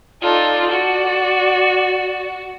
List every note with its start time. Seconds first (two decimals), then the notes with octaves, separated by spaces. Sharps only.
0.23 D#4 F4 A4 D5
0.72 F#4